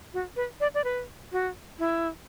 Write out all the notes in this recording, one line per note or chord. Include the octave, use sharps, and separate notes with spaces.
F#4
B4
D5
D5
B4
F#4
E4